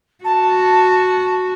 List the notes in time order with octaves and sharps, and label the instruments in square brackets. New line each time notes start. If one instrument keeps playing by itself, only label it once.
[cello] F#4 [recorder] A5